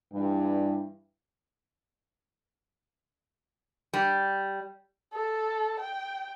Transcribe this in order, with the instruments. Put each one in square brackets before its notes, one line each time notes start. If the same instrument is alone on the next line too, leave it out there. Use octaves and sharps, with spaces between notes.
[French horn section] G2 E3 G3
[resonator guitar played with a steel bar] G3
[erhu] A4
G5